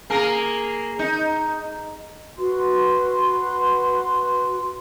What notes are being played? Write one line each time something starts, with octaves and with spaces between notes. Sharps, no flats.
A#3 G#4 A#4
D#4
F#4 B4 C6